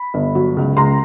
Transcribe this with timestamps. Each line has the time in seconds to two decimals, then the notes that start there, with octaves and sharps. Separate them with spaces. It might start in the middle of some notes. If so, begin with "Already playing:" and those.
Already playing: B5
0.14 G1
0.35 F#3
0.57 C#2
0.77 C#2 A#5 C6